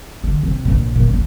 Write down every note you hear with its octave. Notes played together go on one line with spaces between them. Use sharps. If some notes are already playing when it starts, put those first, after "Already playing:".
D3
C3
A#1 A#2
A#2
D2 D4